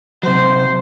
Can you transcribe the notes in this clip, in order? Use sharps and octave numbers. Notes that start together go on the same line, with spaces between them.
C3 F#3 C5